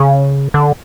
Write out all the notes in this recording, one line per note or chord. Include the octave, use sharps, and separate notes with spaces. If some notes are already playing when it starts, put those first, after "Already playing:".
Already playing: C#3
D3